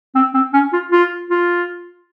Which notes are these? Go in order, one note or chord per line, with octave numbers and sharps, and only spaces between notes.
C4
C4
C#4
F4
F4
F4